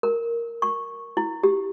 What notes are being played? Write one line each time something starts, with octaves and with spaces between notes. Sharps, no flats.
A#4
C#6
E4
G4